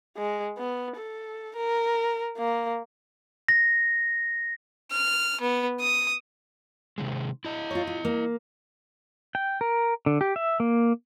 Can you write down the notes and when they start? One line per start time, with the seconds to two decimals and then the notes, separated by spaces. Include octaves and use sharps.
0.17 G#3
0.58 B3
0.97 A4
1.57 A#4
2.38 A#3
3.48 A#6
4.92 F6
5.41 B3
5.80 D#6
6.98 C3 D#3 G#3
7.45 E4 D#5
7.71 F4 C#5
7.87 F4
8.05 A#3
9.35 G5
9.61 A#4
10.06 D3
10.21 G4
10.36 E5
10.60 A#3